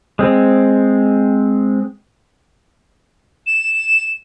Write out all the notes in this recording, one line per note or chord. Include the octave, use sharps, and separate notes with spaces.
G#3 C4
E7